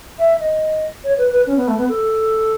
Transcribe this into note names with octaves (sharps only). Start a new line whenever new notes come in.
E5
D#5
C#5
B4
B4
C#4
B3
A3
B3
A4